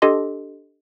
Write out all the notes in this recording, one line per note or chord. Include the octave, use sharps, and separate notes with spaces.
D4 G4 A4 D#5 C6